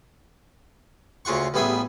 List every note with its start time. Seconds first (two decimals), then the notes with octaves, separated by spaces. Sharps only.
1.25 D2 C#3 F4 F#5 C#6
1.54 A1 G3 B3 G#4 E5